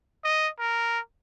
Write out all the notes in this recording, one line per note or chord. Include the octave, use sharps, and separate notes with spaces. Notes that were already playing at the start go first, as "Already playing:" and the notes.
D#5
A#4